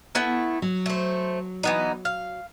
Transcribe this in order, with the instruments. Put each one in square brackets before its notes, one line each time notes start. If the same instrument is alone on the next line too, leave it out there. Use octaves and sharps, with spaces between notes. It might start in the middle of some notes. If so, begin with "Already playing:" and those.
[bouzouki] A3 B3 E4
[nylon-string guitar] F#3
[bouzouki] A3 C5
E3 B3 D#4
F5